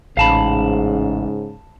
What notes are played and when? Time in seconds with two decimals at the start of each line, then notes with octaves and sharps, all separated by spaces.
0.17 A1 G#2 C#3 F5 A5 B5